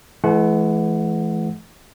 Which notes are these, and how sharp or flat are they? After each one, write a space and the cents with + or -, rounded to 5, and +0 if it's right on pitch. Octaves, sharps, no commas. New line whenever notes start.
E3 +20 A3 -45 F#5 +0